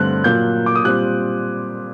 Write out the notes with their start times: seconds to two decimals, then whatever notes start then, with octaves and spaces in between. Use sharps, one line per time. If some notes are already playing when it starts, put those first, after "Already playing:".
Already playing: G2 D3 A3 C4 F#6
0.24 A#2 F#3 A#3 G6
0.66 D6
0.75 D#6
0.84 A#2 G3 C4 F#6